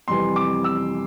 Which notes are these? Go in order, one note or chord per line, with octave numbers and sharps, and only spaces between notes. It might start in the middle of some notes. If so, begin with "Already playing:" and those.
F2 C3 E3 G3 C6
D6
E6